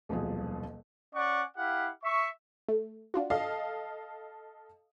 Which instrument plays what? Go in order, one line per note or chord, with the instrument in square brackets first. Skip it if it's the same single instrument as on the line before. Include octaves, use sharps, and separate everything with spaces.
[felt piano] D#1 C2 B2 F3 F#3 G#4
[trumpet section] C#4 D5 F#5 C#6
E4 G4 F5 F#5
E5 C#6
[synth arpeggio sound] A3
D4 F4 F#4
[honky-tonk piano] A4 D#5 F5